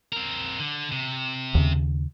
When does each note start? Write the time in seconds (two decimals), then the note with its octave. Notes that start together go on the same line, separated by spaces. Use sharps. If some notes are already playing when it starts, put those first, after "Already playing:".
0.12 C4 A#4
0.59 D3
0.92 C3
1.55 D#2 C#3